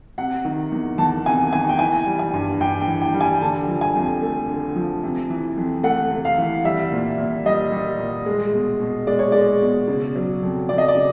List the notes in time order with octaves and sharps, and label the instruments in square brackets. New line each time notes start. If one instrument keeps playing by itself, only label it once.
[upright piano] C3 F#5
D#3
E2
E2 A5
C3 G#5
D#3 G#5
G5
E3 G#5
G3
G#5
G2
G2 G5
G5
E3
G5
G3
G#5
D3 A5
F3
G#5
F2
A3
D3
F3
C3
E3
F2
A3 F#5
C3
F5
E3
G3 E5
A#2
A#2
G3 D#5
G3
A#2
G#3
B2
B2
G#3 D5
C#5
G#3 D5
B2
C#3
F#3
F2
F2 D5
D#5
D5
C#3